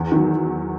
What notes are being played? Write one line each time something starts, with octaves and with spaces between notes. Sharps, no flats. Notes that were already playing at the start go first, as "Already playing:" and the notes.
Already playing: E2
D#3 F#3